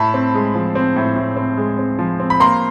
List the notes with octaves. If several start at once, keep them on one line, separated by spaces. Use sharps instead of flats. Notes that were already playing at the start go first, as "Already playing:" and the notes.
Already playing: A2 A5 B5
C4
G#3
F3
C4
A2
A2
C4
G#3
C4
F3
C4
B5
A#3 A#5 C6